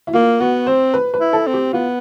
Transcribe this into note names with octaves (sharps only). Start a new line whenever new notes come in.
E4
A#3 F4
B3 F#4
C4 C5
B4
B4
E4
A4
C4
G4
B3 F4